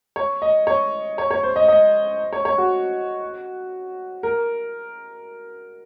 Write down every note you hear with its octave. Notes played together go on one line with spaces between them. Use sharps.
C#5
D#5
C#5
C#5
C#5
C5
D#5
D#5
C#5
C#5
F#4
A#4